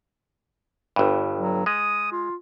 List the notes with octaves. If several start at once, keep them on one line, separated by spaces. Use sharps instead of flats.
G1 G2
F#3
G#3 D#6
F4